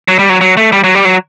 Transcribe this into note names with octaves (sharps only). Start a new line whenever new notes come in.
F#3
G3
F#3
F#3
A3
G3
F#3
G3
F#3